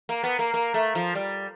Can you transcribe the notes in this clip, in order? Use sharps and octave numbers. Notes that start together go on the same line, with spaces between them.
A#3
B3
A#3
A#3
A3
F3
G3